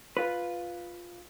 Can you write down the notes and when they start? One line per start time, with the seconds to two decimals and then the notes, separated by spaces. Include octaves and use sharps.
0.17 F4 B4